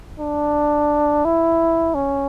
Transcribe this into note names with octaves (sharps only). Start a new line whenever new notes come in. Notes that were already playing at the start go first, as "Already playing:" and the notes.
D4
E4
C#4